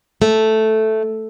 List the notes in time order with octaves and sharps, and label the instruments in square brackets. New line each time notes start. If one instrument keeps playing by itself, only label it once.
[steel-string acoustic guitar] A3